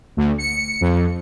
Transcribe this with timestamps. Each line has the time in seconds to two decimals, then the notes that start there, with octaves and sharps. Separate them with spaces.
0.17 D2
0.38 C#7
0.81 F2